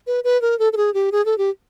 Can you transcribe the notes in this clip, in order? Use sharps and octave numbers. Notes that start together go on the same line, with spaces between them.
B4
B4
A#4
A4
A4
G#4
G4
G#4
A4
G4